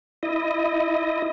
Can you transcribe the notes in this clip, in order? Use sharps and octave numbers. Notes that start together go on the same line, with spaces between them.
E4 D#5